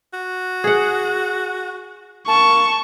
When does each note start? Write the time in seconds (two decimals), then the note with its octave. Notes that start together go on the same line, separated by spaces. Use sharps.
0.13 F#4
0.64 G#4 F#5
2.28 A#3 A5 C#6